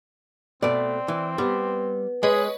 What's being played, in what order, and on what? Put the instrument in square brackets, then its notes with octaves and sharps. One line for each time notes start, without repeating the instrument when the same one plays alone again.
[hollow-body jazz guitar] B2 A3 [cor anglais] C4 [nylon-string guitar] D5
[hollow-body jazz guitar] E3
[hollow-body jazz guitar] G3 [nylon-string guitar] B3
[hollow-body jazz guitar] G#3 [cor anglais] G#4 [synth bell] B4 C#5 D#5